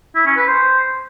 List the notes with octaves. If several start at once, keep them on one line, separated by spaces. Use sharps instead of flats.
E4
C#4
B4
C5